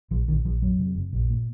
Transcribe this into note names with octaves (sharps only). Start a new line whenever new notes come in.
A#1 F3
A#1 D#3
A#1 F3
F2 F#3
C3
F#1
A#1
A#2